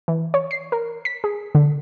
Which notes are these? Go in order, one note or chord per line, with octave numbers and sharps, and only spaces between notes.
E3
C#5
C7
A#4
B6
G#4
D3